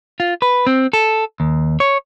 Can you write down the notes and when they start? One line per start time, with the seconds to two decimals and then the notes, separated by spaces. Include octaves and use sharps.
0.20 F4
0.42 B4
0.67 C4
0.93 A4
1.40 D#2
1.80 C#5